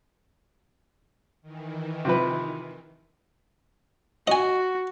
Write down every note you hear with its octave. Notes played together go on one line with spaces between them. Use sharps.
D#3 E3
C3 F3 B4
F#4 D#5 G#5